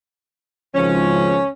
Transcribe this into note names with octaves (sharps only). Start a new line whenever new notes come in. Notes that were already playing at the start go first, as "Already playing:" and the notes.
G#1 C#2 F3 C#4